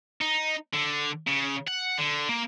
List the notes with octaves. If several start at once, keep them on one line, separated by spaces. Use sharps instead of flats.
D#4
D3
C#3
F#5
D3
A#3